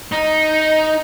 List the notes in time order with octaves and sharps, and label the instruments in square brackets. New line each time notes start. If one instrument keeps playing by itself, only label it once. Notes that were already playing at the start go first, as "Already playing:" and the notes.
[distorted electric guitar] D#4